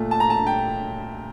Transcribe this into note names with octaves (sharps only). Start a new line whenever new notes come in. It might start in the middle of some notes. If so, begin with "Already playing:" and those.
Already playing: A#2 A3
A5
A#5
A5
G5